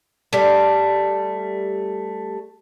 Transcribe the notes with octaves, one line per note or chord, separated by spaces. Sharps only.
G3 A3